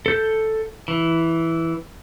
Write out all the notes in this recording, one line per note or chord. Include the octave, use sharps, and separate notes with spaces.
A4 G6
E3